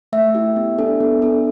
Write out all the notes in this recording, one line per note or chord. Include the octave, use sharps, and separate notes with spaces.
A3 E5
E4 G4
B3
D4 A4
B3
D4 A4